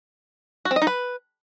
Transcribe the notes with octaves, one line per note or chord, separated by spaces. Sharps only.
F#4
C4
D#5
D#4
B4